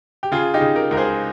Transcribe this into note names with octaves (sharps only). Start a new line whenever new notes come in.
G4
C#3 F4 G#4
D#4 G4
C#3
G4 A#4
C#2 A#4
G#4 C5